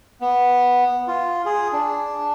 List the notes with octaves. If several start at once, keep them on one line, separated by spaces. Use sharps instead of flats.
B3
F4
G#4
D4